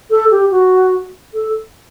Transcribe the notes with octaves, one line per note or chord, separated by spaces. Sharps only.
A4
G4
F#4
A4